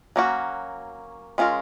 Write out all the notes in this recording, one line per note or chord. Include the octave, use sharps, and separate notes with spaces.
F#3 A#3 C#4 F#4
G#3 C#4 F4 A#4